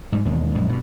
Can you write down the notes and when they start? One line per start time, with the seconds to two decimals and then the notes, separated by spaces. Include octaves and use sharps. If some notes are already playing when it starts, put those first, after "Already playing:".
0.12 G#2 G3
0.25 E1 D#2 G#3
0.55 A#1 F#2 G#3
0.69 G2 B2